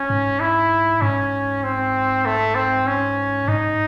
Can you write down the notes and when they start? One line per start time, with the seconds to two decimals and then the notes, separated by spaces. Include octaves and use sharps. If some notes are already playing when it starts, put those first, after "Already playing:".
Already playing: C#4
0.10 G#2
0.40 E4
1.01 G#2 C#4
1.63 C4
2.25 A3
2.55 C4
2.87 C#4
3.48 G#2 D#4